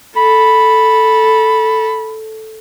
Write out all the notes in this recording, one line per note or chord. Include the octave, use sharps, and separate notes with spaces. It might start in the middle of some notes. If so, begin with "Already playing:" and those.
A4 B5